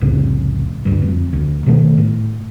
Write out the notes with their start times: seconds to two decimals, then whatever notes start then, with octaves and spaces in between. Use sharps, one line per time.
0.01 C2 F2 A2 C#3
0.85 D2 G2
1.02 F2
1.33 D2
1.66 B2 D#3 G3 A3
1.97 A2